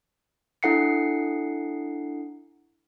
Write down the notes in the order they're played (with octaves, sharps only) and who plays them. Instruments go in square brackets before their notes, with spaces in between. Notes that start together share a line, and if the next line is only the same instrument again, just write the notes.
[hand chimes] D4 E4 A4 F#5 C7 C#7